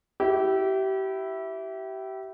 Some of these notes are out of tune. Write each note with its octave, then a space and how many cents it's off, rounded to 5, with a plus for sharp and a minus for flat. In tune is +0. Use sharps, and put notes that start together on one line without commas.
E4 +0 G4 -30